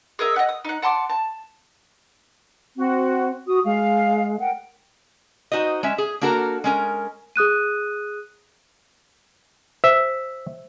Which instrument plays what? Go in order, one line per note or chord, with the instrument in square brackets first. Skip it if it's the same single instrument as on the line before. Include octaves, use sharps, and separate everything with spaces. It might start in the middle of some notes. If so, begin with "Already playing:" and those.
[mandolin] G#4 A#4 D#5 E5
D#5 F#5
D#6
D#4 F#5
F#5 A5 C6 D6
A5
[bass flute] C4 [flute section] F#4
[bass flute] F#4 [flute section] D#6
[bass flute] G#3 [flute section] F5
[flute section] A#4 G5 [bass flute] F#5
[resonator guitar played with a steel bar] D#4 F#4 C5 D#5
G#3 C#4 E5
G#4
A#3 D4 F#4 A4 A#4 A#5
G#3 C#4 A#4
[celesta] G#4 D#6 F#6 D#7
[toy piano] C5 [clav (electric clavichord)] E5